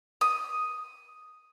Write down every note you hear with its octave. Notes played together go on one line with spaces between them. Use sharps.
D#6